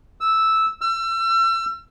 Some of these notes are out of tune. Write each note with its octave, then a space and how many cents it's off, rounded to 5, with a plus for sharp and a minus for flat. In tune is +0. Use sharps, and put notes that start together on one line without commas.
E6 -5
E6 +35